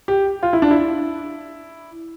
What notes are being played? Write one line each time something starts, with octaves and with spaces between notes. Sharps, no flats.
G4
F4
E4
D4
E4